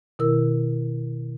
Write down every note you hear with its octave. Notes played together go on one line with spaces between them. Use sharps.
B2 D#3 E4 A#4 E6